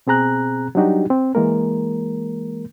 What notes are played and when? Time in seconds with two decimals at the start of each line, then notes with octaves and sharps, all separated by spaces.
0.07 B2 C4 G#4 A#5 F#6
0.75 F#3 G3 D4 D#4 F#4 G4
1.10 C4
1.35 E3 G#3 A#3 A#4